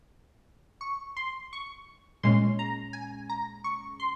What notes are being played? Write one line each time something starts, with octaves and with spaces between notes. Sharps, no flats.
C#6
C6
C#6
A#2 G#3 C#4 C6
A#5
G#5
A#5
C#6
C6